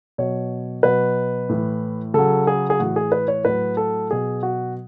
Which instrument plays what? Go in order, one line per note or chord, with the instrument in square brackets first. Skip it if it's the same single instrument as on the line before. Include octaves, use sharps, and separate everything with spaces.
[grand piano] B2 F#3 C#5
B2 F#3 B4
A2 E3
C#3 F#3 A4
G#4
G#4
A2 E3 F#4
G#4
B4
C#5
A2 F#3 B4
A4
B2 F#3 G#4
F#4